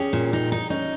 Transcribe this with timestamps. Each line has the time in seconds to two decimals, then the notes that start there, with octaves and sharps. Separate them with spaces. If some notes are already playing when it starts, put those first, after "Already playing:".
Already playing: C#4 G4 G#4
0.13 A#2
0.33 D#4
0.52 D#4
0.70 C#4 D#4